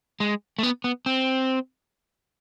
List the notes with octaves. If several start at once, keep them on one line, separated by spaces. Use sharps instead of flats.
G#3
A3
B3
B3
C4